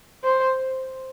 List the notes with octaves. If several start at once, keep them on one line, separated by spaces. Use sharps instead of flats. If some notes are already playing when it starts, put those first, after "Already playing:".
C5